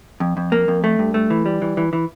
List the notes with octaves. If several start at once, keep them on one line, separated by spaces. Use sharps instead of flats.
F2
F2
A#3
F2
A3
G2
A3
E3
G3
E3
E3
E3